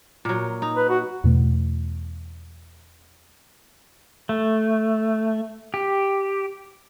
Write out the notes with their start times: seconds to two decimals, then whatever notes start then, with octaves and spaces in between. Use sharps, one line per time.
0.25 A#2 F#3
0.62 D#4
0.76 B4
0.90 F#4
1.24 E2 B2 A3
4.29 A3
5.74 G4